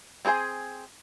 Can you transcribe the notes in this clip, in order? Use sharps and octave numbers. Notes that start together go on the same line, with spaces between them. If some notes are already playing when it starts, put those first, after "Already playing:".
C4 D#4 G#4 C5 G#5